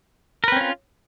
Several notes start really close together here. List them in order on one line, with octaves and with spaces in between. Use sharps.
A#4 B4 C4 C#4 F4